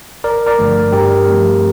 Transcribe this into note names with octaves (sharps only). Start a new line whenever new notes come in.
G1 A#4 D5
A#4 D5
G2 D3 F3 A3
G2 G4 A#4
F3 A3 C4